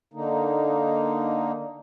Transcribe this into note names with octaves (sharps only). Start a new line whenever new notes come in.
D3 A#3 D#4